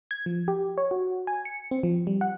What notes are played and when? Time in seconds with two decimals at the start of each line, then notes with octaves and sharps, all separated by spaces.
0.11 G#6
0.26 F3
0.48 G4
0.78 C#5
0.91 F#4
1.27 G#5
1.45 C#7
1.71 C4
1.83 F3
2.07 G3
2.21 F#5